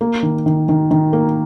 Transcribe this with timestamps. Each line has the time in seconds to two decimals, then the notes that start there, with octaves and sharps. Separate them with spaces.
0.01 A#3
0.23 D#3
0.46 D#3
0.69 D#3
0.91 D#3
1.13 A#3